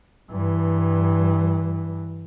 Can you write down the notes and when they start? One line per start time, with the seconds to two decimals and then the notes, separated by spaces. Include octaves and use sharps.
0.31 G2 E3